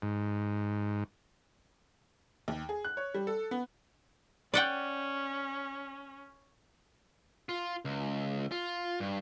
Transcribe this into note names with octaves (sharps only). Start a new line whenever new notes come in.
G#2
D#2
G#4
F#6
C#5
G3
A4
B3
C#4 D5 F#5 G5
F4
C#2
F4
G2